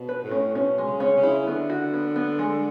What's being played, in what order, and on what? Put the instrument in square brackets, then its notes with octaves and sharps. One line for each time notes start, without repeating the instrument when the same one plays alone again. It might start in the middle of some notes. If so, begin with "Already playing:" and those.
Already playing: [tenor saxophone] B2
[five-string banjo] B4
[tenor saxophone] A2
[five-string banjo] C#4
[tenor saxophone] B2 [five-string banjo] C#4
[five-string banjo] G#3
[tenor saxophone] C#3
[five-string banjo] C#4
[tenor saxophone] C#3
[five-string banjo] E4
[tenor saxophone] D3 [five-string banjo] B3
[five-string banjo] F#4
B3
B3
G#3